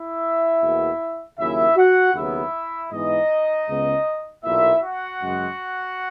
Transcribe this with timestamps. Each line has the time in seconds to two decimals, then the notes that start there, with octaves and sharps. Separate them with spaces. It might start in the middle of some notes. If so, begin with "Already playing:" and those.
Already playing: E4 E5
0.62 E2 B2 A#3
1.38 D#2 C#3 F#3 A#3 E4 E5
1.77 F#4 F#5
2.15 D#2 C#3 F#3 B3 E4 E5
2.91 G#2 E3 B3 D#4 D#5
3.68 C#2 C#3 G#3 B3
4.44 B1 A#2 A#3 E4 E5
4.82 F#4 F#5
5.21 F#2 C#3 G#3